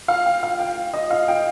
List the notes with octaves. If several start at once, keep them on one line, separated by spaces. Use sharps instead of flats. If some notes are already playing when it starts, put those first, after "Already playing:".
F5
G5
F5
G5
D#5
F5
G5